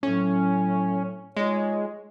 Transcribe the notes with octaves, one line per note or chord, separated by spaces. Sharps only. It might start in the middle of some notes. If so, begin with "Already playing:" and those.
A2 F#3 C#4
G#3 D#4 F4 C#5